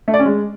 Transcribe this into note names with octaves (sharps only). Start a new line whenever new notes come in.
A3
D5
C#4
G#3